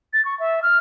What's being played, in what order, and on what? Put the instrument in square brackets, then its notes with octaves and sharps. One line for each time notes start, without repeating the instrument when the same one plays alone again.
[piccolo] A6
C#6
E5
F6